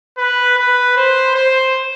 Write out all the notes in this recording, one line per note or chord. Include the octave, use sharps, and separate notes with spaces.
B4
B4
C5
C5